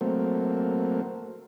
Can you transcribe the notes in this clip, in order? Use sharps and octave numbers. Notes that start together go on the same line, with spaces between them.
F#3 A3 A#3 C4